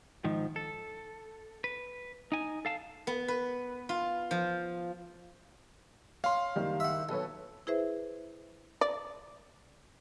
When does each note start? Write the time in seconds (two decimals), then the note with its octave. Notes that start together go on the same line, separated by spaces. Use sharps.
0.24 G#2 D#3 F3
0.56 A4
1.64 B4
2.32 D#4 G#5
2.65 A4 F5 A5
3.07 B3
3.28 B4
3.89 F4
4.31 F3
6.24 C#4 F5 C6
6.55 F#1 D#3 G3
6.80 E5 F#5
7.09 B1 A4 B4 C#5
7.67 E4 G#4 B4 C5 E5
8.81 D5